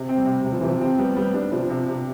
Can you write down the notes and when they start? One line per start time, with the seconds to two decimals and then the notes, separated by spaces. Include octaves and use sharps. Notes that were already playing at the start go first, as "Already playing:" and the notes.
Already playing: C3
0.09 C4
0.17 G3
0.26 C3
0.45 C3 G3
0.52 F3
0.61 C3 E3
0.69 F3
0.81 C4
0.98 G3 B3
1.17 G3 B3
1.34 D4
1.52 C3 F3
1.70 C3
1.88 C3